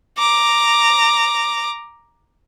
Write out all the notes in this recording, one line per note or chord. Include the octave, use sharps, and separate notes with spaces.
A#5 D6